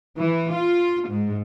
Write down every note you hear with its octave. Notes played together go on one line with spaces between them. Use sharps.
E3
F4
G#2